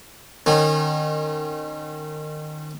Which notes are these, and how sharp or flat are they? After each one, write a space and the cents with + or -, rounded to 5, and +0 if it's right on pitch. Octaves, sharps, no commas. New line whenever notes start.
D#3 -30 C#4 -35